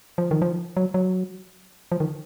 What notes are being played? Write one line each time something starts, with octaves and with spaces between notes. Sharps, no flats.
F3
D#3
F3
F#3
F#3
F3
D#3